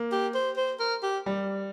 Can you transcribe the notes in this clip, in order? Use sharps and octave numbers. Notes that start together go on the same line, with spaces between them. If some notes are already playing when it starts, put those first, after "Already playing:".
Already playing: A#3
G4
C5
C5
A#4
G4
G3